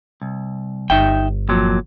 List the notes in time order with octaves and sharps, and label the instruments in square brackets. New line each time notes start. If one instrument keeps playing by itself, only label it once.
[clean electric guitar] C2
[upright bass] G1 [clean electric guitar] D#4 E5 G5
[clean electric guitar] F2 A#2 F#3